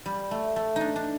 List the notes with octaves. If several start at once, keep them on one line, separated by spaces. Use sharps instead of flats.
G3
A3
A3
D4 D#4
D4